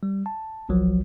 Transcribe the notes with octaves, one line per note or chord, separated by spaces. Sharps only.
G3
A5
G1 C2 F3 F#3